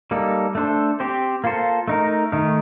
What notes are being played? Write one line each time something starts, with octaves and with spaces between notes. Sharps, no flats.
G3 A#3 D#4 A4
A3 D4 A4 C5
C4 G4 C5
A#3 F4 A4 C5
A3 D#4 A#4
D#3 A3 D#4 A#4